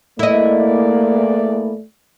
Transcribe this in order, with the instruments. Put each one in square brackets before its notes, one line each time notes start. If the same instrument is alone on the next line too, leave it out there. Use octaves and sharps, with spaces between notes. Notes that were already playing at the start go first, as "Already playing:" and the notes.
[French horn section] E2 D5 [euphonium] A3 [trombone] A#3 [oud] E4 D#5